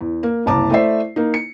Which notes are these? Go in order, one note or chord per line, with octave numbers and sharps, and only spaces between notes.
E2
A#3
F#1 C2 A5 A#5 D6
A3 E4 C5 D5 E5 C7
A#3 D#4
C#7